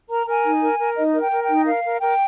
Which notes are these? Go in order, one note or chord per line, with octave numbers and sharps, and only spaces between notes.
A#4 A#5
A#4 G#5
D#4
A#4
A#4
D#4 D#5
A#4
G5
A#4
G5
D#4
A#4 F5
A#4
A#4 G5